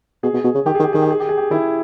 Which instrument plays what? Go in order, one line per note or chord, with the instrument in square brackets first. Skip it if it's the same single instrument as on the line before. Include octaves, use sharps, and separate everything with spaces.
[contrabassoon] B2 [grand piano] G#4
[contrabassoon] B2
B2
C#3
[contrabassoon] D#3 [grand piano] G4
[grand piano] G#4
[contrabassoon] D#3
[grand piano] G4
[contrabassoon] D#3 [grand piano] G#4
[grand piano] G4
G#4
G4
G#4
G4
[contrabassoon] D#3 [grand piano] E4